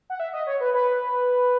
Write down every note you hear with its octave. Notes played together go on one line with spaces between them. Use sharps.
F#5
E5
D#5
C#5
B4
B4